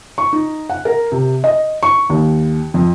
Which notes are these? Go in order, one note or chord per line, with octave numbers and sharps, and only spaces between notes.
C#6
D#4
F#5
A#4
C3
D#5
C#6
D#2
F2